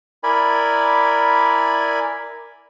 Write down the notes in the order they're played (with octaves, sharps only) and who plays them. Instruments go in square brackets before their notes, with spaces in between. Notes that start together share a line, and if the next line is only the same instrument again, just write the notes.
[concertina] E4 A#4 D5 G#5 B5